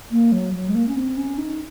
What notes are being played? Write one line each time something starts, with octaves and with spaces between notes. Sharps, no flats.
A#3
F#3
F#3
G#3
A#3
C#4
C4
C#4
D#4